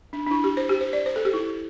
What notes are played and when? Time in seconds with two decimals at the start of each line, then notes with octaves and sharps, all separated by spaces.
0.13 D4
0.27 D4
0.31 E4
0.44 G4
0.57 C5
0.69 G4
0.81 C5
0.93 D5
1.06 C5
1.16 A4
1.25 G4
1.34 E4